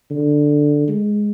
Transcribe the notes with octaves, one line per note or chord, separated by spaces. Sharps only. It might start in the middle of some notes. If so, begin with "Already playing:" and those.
D3
G#3